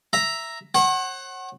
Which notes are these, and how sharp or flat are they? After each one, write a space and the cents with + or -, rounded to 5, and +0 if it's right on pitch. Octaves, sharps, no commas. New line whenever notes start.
E5 +5 A#5 +0
C#5 -45 F#5 +15